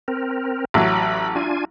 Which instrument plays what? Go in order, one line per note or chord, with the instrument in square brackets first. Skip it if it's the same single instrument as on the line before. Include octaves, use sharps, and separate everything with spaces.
[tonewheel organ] C4 A#4
[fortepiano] A1 F#3
[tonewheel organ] B5
D4 F4 G#5